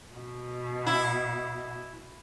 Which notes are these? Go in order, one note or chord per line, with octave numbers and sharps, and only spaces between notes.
B2
E4